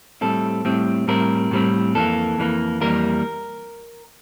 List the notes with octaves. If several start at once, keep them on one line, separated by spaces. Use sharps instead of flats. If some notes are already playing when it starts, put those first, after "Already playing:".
A2 G3 C4 A4
A2 G3 C4
A2 G3 C4 A#4
A2 G3 C4
F2 E3 G3 A#3 A4
F2 E3 G3 A#3
F2 E3 G3 A#3 A#4